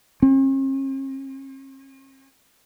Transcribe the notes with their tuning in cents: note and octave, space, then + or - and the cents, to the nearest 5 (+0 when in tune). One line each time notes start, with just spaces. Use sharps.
C#4 -45